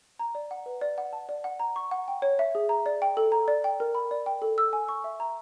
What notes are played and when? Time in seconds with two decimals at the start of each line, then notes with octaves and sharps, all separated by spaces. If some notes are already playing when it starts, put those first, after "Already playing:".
0.19 A#5
0.35 D5
0.51 F#5
0.66 B4
0.81 D5
0.98 F#5
1.13 A5
1.29 D5
1.44 F#5
1.60 A#5
1.76 C#6
1.91 F#5
2.08 G5
2.22 C#5
2.39 E5
2.55 G#4
2.69 A#5
2.86 D5
3.02 G5
3.17 A4
3.32 A#5
3.48 D5
3.64 G5
3.80 A#4
3.95 B5
4.11 D5
4.26 G5
4.42 A4
4.58 E6
4.73 G#5
4.89 C#6
5.04 E5
5.20 A#5